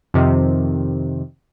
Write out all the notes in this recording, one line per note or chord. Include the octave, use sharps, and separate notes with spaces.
F2 C3 D#3